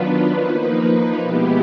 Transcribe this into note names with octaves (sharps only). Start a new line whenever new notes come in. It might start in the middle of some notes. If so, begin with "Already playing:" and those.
Already playing: D#3 F#3 B3 D4 F4 B4
F3 A#3 D#4
B2 G#3 B3 E4 G4